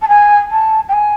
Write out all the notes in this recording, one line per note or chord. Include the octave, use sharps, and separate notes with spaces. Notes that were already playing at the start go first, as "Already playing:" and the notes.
A5
G#5
A5
G5
G#5